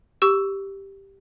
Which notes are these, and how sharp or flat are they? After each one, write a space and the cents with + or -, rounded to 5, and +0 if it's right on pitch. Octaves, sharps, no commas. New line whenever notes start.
G4 +0 C#6 +20 E6 +0